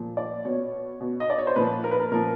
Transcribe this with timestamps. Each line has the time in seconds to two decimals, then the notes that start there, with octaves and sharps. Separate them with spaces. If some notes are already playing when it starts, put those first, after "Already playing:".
Already playing: A#2 F3
0.17 D5
0.45 B2 C#5
1.01 B2
1.20 D#5
1.30 D5
1.38 C#5
1.47 C5
1.56 A#2 F3 B4
1.84 A#4
1.91 B4
2.00 A#4
2.11 A#2 F3 A#4